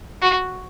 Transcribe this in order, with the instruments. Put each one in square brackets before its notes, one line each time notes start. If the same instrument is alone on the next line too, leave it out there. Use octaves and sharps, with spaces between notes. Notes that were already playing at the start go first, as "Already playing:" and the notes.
[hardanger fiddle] F#4